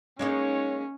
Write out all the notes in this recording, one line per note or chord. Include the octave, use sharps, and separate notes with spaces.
G#3 A#3 C#4 D#4 C#5